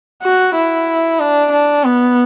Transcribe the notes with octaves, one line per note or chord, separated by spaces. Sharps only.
F#4
E4
D4
D4
B3